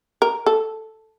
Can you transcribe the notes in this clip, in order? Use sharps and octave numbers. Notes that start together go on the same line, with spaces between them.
A#4
A4